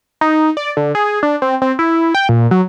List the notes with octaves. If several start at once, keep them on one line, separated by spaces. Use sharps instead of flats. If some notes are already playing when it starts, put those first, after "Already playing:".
D#4
D5
D3
G#4
D4
C4
C4
E4
G5
A#2
F#3